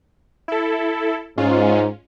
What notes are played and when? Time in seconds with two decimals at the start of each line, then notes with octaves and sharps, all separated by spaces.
0.48 E4 A4
1.38 G#2 G#3 C#4 F4